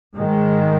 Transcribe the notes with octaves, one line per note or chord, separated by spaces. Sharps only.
G#2 D#3 G#3